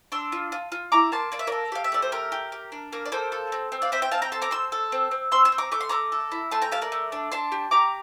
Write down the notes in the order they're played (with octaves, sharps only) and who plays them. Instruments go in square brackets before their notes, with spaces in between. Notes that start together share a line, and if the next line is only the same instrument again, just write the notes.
[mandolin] D4 C6 E6
F4
F4
F4
E4 A#5 D6
A#3 A5 C6
A#3 D5
E5
A#4 D5
A4
G4 F5
E5
A3 D5
C5
G4 A#4
G4
G4
D4
A#3 A#4
D5
A#3 A4 C5
A4
C4
C4
D5 F5
C4 C5 E5
E5 G5
C4 F5 A5
G5 A#5
A4 A5 C6
A#5 D6
C4 C6 E6
A4
C4
C4
C4 C6 E6
C6 E6
C4
A#5 D6
A3 D6
C6
A3 A#5 D6
A4
E4
A3 A5 C6
G5 A#5
G4 F5 A5
A#4 D5
A3
D4
D4 A5 C6
G4
G4 A#5 D6